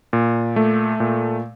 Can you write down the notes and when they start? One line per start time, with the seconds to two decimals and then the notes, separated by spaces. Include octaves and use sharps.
0.13 A#2
0.56 A3
1.00 A#2